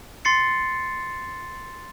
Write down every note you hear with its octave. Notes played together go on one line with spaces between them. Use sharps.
C6 A6 C7 C#7